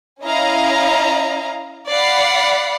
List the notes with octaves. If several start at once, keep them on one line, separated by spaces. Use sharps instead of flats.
C#4 E4 D#5 F5 A#5
D5 F5 F#5 B5 C7